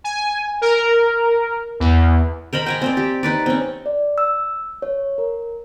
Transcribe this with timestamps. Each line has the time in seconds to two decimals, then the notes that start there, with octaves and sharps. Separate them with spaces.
0.04 G#5
0.61 A#4
1.80 E2
2.53 A#4 C5 D#5 B5
2.66 G5 G#5 A#5
2.82 C4 C5 D5
2.97 G4
3.23 D#4 B4 D5
3.46 C4 C#4
3.86 D5
4.18 E6
4.82 C#5
5.18 A#4